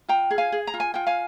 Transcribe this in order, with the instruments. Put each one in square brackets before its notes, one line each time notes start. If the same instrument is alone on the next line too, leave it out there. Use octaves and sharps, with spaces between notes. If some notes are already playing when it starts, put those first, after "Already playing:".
[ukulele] F4 G5 A#5
G#4
F5 G#5
G#4
A#5
F4
G#5
F4 G5
F5 G#5